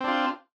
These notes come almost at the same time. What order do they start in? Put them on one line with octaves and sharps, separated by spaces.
C4 D4 F4